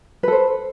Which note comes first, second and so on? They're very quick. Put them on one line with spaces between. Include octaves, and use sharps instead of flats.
B4 A4 C5